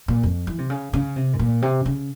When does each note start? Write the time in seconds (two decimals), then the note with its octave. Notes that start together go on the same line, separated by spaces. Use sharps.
0.08 A#2
0.23 F2
0.47 E3
0.58 C3
0.70 C#3
0.93 C#3
1.16 C3
1.33 G#2
1.39 A#2
1.62 C3
1.86 C#3